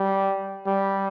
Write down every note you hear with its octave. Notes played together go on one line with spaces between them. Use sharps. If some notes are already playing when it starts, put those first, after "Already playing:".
Already playing: G3
G3